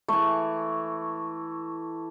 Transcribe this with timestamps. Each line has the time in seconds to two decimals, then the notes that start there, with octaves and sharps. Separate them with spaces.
0.08 E3 A3 C#6